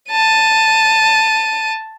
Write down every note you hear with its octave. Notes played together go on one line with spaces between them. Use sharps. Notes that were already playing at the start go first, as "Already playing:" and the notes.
A5 D#7